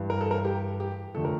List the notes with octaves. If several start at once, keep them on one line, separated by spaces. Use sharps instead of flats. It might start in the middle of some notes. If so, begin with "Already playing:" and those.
Already playing: G2 E3 G3
A#4
A4
A#4
G4
G4
F2 D3 A3 A4
A#4